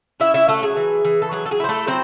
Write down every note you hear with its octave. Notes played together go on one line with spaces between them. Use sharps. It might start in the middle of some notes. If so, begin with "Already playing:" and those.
C#4 E4 E5
E4 E5
F#3 A3 A4
G#4
E3
E3
A4
F#3 G#4
A4
G#4
E4 C5
A3 A4
F#3 C4 C5